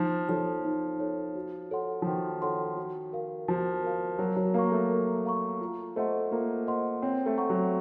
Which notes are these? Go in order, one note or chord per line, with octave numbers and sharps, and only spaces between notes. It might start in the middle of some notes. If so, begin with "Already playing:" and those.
Already playing: F3 D#4
F3 A4 C#5
D#4
A4 C#5
F#4
A4 C#5 F#5 C6
F3
D#3 F#4
A4 C#5 F#5 C6
F#4
A#4 F5
F3 F#4
A#4 F5
F#3 A#4
F#3
A#3 F5 A#5 C#6
A3
A#4
F5 A#5 C#6
F4
A3 C5 D#5 F#5 C6
A#3 F4
C5 D#5 F#5 C6
C4 C#5
A3
F#5 A#5 C#6
F#3